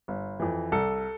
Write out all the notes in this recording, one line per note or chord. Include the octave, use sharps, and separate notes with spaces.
G1
F2 E3
C2 A4